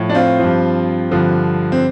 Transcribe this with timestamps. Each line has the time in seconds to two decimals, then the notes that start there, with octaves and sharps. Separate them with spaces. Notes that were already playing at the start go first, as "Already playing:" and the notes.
Already playing: A2 F3
0.09 D4
0.15 C4 F4
0.39 G2 F3
1.11 G2 D3 F3
1.72 C4